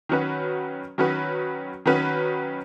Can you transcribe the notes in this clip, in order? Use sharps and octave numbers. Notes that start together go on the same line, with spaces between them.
D#3 F#3 C#4 F#4 B4
D#3 F#3 C#4 F#4 B4
D#3 F#3 C#4 F#4 B4